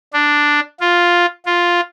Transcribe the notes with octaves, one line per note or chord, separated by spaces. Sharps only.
D4
F4
F4